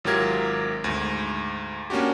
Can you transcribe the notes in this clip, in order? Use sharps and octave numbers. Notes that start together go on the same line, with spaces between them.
G#1 F#3 F4 G4 A#4 G#6
D2 G#2
A#3 C#4 D4 F#4 G4